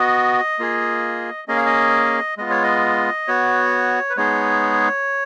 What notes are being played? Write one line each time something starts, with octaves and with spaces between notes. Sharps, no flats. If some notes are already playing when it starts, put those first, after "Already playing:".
Already playing: B3 F#4 D#5
A#3 F4 G#4
A#3 C#4 G#4 D#5
F5
D#5
G#3 B3 F4 D#5
C#5
D#5
B3 F#4 C#5
B4
G#3 B3 D#4 G#4 C#5